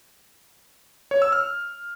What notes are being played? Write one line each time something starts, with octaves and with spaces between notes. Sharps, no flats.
C#5
E6
F6